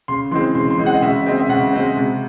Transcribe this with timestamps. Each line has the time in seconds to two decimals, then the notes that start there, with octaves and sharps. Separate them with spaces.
0.08 C#3 C6
0.31 E3 G#3 C4 C6
0.55 C#3 C6
0.71 C6
0.78 E3 G#3 C4
0.86 F#5
0.94 D#5
1.02 C#3 E5
1.26 G#3 C4 D#5
1.40 E5
1.49 C#3 F#5
1.73 G#3 C4
1.97 C3